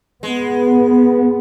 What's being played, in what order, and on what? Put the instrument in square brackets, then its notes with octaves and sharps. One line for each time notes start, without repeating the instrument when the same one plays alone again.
[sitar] G#3 [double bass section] B3